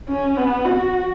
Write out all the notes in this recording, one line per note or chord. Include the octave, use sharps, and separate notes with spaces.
C#4
B3
F#4